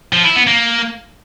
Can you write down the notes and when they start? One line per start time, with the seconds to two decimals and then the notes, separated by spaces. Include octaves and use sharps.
0.13 F3
0.24 E4
0.36 B3
0.47 A#3